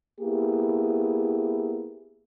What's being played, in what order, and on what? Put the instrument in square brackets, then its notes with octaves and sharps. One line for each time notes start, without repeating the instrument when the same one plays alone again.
[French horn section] A#3 B3 E4 G4 G#4